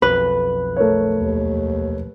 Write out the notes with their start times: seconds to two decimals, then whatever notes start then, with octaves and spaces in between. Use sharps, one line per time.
0.02 B1 F2 B4
0.76 A3 A#4 C#5
1.14 D#2